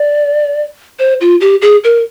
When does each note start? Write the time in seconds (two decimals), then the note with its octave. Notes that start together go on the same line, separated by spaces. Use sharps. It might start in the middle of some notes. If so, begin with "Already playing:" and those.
Already playing: D5
0.99 C5
1.21 F4
1.41 G4
1.62 G#4
1.84 A#4